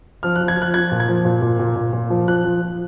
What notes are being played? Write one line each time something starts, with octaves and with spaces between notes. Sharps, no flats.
F3 F6
F#6
F3
G#6
F3 F#6
F3 G#6
A#2
G#6
F3
A#2
A#2
A#2
A#2
A#2
F3
F3 F#6
F3
F3